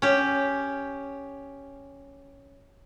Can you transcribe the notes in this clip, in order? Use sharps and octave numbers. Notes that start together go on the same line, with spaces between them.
C#4 G4